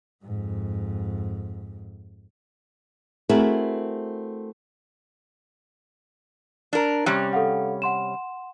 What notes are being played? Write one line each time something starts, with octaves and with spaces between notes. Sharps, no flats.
F2 G#2
A3 C4 E4 F#4 G#4 A#4
D4 A#4
C3 G3 C#4 F#6
A4 F5 F#5
F#5 C6 E7